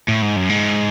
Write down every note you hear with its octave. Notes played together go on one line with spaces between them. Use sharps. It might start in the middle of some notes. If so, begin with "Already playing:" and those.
A2
G#2
F#2
G#2